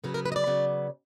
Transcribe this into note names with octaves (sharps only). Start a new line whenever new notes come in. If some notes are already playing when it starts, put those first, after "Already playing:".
C#3 F#3 B3 A#4
A#4
B4
D#5
D5
C#3 F#3 B3